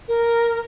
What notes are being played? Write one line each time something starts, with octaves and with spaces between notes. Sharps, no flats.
A#4